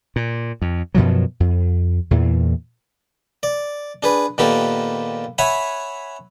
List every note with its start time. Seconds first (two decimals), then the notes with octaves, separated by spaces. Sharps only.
0.16 A#2
0.62 F2
0.95 F#2 B2 F3 F#3
1.40 F2
2.11 E2 A#2 E3
3.43 D5
4.03 D4 G#4 B4
4.38 A#2 D#3 B3 G4 A4
5.38 C#5 E5 F#5 G#5 B5